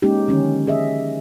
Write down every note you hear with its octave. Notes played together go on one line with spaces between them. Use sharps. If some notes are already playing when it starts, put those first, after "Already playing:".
G#3 A#3 C#4 D#4 G4
D3 D#3 F3 C#4
G#4 D#5 E5